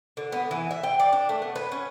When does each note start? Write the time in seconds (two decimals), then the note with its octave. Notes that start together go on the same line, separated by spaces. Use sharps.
0.17 D3
0.32 B3
0.51 E3
0.71 E5
0.83 G5
1.00 D5
1.13 D4
1.29 A3
1.42 B3
1.56 B4
1.72 C#4